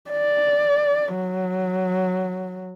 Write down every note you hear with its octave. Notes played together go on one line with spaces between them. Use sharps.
D5
F#3